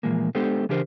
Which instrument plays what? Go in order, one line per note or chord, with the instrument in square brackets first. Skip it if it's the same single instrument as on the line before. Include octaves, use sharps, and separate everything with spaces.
[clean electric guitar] A#2 E3 F3 G#3 A#3
G#3 B3 D4 G4 A4 C5
C#3 E3 D4 G4 A#4 C5